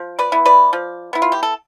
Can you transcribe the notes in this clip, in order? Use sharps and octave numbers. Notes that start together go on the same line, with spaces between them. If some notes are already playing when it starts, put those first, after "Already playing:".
Already playing: F3
B4 D5
B3 E4
B4 D5
F3
B3 E4
F4
G4
A4